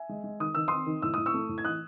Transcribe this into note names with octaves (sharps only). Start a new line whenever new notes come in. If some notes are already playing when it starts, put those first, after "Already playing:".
Already playing: E5 G#5
G#3
G#3
D#3 D#6
D#3 E6
C4 C6 D#6
D#3
A2 E6
A2 D#6
C#6 E6
A3
A2
G#6
E3 D#6 F#6